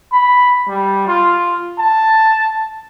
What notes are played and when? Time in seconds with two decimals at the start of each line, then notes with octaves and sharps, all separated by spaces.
0.12 B5
0.68 G3
1.07 F4
1.79 A5